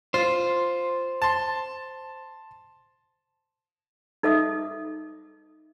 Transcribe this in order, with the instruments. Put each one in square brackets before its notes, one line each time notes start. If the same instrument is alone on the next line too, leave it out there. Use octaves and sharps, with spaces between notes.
[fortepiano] F4 [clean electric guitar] C5
[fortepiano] A5 C6
[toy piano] D#4 A4 D#5 E5 D6 D#6